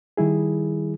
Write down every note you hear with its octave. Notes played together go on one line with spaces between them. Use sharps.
D#3 G3 E4 G#4